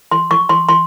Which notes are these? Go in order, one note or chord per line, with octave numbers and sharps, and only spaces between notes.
C6
C#6
C6
C6